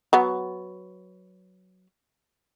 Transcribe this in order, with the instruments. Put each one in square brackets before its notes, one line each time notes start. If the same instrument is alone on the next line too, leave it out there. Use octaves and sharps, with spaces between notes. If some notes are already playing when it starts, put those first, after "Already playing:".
[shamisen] F#3 B3